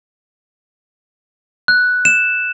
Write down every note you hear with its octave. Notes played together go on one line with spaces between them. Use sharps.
F#6
E7